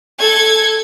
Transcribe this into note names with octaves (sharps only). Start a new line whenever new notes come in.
A4 G#6